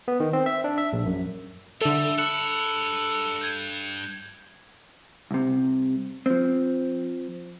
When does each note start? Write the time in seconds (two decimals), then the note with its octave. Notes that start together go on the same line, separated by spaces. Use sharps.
0.08 B3
0.20 D#3
0.33 C4
0.46 E5
0.64 D4
0.78 E5
0.93 A#1
1.06 F#2
1.81 D3 G3 A4 E5
2.18 G2 A4 B5 F#6 C#7 E7
3.41 G6 G#6 D#7
5.31 C2 C3
6.26 F3 C4